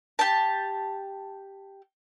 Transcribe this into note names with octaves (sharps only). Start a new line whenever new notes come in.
G4 A5